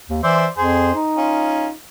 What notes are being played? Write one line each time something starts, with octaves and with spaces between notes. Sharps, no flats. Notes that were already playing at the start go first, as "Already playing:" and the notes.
D#2
E3 C5 D5 E5
F2 G#4 C5
D#4
C#4 F4